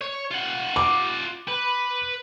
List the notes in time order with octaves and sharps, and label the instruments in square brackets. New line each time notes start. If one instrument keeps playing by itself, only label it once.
[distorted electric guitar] C#5
F4 F#5
[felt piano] D6
[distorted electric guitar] B4